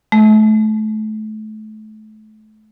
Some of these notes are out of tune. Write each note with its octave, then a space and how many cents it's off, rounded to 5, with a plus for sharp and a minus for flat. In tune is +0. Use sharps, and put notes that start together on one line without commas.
A3 -30